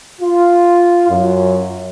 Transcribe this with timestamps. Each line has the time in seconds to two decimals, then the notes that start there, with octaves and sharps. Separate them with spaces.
0.21 F4
1.10 F#2